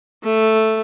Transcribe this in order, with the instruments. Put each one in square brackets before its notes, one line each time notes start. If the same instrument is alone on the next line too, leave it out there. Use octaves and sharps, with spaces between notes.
[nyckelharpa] A3